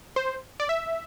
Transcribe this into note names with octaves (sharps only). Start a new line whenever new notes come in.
C5
D5
E5